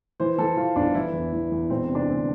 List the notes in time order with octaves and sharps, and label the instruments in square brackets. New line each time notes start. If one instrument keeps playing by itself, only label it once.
[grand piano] E3 C5
E3 A4
E3 F4
G1 D4
E3 E4
E2
E3
E2
E1 C4
C3
D4
D2 C4